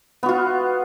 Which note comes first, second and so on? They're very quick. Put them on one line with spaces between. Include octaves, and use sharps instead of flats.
B3 F#4 F4